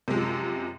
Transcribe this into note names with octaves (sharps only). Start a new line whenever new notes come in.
F#2 C3 F3 G#3